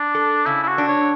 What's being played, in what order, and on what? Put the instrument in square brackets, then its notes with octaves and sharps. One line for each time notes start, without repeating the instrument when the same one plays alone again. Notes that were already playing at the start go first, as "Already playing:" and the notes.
Already playing: [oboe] D4
[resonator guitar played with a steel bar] A4
[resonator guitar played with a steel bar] C#3 [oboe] E4
[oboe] E4
F#4
[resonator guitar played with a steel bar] D4
[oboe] C#5